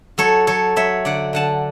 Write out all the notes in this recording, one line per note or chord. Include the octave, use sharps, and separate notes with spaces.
F#3 A4 C#5
F#3 A4 C#5
F#3 C#5 E5
D3 D5 F#5
D3 F#5 A5